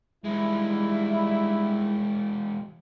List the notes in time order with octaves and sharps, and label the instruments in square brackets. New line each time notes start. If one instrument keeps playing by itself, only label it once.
[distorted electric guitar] E3 G#3 [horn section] G3 D#4 E4